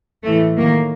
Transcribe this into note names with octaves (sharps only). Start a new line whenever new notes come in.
A2 E3 A3
D#3 F#3 A#3